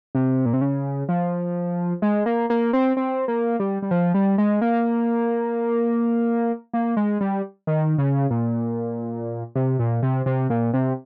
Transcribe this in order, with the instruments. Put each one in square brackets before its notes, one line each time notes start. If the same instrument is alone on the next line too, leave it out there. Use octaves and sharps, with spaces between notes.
[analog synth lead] C3
A#2
C3
C#3
F3
G#3
A#3
A#3
C4
C4
A#3
G3
G3
F3
G3
G#3
A#3
A#3
G#3
G3
D#3
C#3
A#2
C3
A#2
C3
C3
A#2
C3